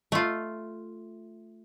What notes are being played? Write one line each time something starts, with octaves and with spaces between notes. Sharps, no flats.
A3 F4